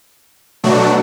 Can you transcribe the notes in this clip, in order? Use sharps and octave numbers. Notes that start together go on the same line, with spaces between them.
B2 F#3 A3 D4 F#4